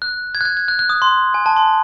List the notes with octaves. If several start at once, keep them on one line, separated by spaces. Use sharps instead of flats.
F#6
G#6
F#6
G#6
G#6
F#6
F#6
D#6
C6
G#5
A5
C6